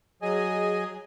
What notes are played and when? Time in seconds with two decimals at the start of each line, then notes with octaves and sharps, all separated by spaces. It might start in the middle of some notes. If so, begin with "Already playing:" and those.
0.22 F#3 G#4 D#5 G#5